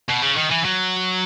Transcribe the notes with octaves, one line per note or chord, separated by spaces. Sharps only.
B2
C#3
D#3
E3
F#3